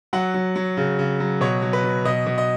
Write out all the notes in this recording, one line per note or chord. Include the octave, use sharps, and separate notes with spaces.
F#3 F#5
F#3
F#3
C#3
C#3
F#3
B2 C#5
F#3
B4
B2
B2 D#5
B2
D#5